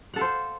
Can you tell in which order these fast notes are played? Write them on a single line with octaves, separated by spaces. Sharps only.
F#5 A4 F5 C5